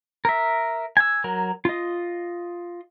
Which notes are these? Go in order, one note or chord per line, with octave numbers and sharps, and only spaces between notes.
A#4 E5
G#5 E6
F#3 A#4
F4 D#5